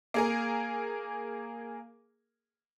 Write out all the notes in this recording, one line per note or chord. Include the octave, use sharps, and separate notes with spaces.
A#3 G#4 A#4